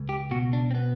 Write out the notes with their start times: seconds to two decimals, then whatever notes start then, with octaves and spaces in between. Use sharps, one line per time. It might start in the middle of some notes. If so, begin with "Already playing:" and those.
Already playing: C#2
0.09 G4
0.31 B2 F#4
0.53 D4
0.71 C4
0.75 B3